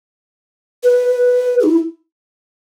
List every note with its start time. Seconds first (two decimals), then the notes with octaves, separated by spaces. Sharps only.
0.83 B4
1.60 G#4
1.63 D#4
1.69 E4